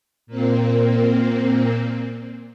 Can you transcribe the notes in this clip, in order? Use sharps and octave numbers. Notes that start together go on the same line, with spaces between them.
A#2 A#3 C4